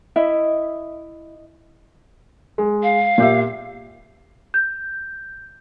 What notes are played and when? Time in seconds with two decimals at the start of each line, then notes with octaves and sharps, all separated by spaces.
0.16 E4 D#5 E5
2.58 G#3
2.83 F5
3.18 A#2 G4 E5
4.54 G6